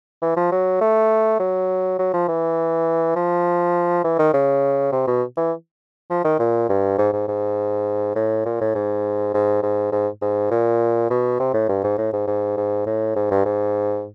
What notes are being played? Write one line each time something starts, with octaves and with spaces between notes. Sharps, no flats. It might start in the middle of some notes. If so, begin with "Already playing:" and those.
E3
F3
F#3
A3
F#3
F#3
F3
E3
F3
E3
D#3
C#3
C3
B2
E3
F3
D#3
A#2
G2
G#2
G#2
G#2
A2
A#2
A2
G#2
G#2
G#2
G#2
G#2
A#2
B2
C3
A2
G2
G#2
A2
G#2
G#2
G#2
A2
G#2
G2
G#2